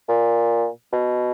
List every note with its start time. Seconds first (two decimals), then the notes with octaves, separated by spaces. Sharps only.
0.09 A#2
0.93 B2